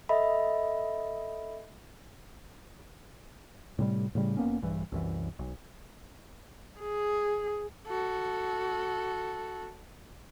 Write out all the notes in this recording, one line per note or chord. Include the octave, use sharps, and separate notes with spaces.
A4 D#5 E5 B5
A2 C3 G3
A2 C#3 G3
F1 A#3 B3 C#4
A#1 G2 E3
C2 F#2 E3
B1
G#4
F#4 A4